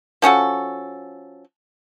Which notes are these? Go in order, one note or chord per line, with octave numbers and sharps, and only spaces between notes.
F3 C#4 F#4 A4